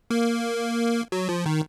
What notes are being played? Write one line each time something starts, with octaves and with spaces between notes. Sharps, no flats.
A#3
F#3
F3
D#3